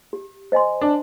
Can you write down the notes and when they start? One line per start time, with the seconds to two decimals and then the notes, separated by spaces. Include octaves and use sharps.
0.13 G4
0.52 C5 D#5 G#5 C6
0.81 D4